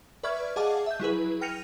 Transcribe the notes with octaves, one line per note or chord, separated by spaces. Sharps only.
B4 D5 E5 C#6 F6 G#6
G#4 D#5 F5 F#5 A5 D6
E5 G6
F#3 E4 G#4 B4
G5 F6 A#6 C#7 D#7 F7